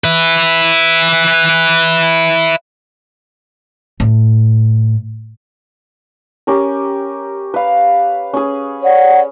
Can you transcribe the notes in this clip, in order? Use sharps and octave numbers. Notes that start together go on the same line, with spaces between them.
B4 E5
A2
C#4 G4 A#4
B4 F5
C#4 G#4
C#5 D5 F#5